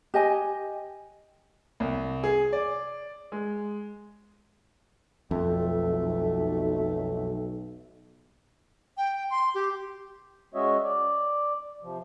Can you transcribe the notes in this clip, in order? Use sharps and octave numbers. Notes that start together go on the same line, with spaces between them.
G4 D#5 G#5
C2
G#4
D5
G#3
B1 F2 A3
G5
C6
G4
G#3 C#4 F#4 C#5 D#5 E5
D5
C3 F3